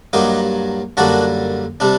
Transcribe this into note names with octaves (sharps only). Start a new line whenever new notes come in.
G2 F#3 A#3 D#4 G4
F#2 D3 G3 A#3 D4 F#4
C3 G3 D4